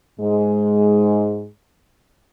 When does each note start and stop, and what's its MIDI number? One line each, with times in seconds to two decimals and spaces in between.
0.20 1.48 44
0.20 1.48 56